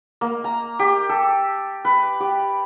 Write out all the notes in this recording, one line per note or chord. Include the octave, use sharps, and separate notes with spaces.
A#3
A#5
G4
A4
B4
G4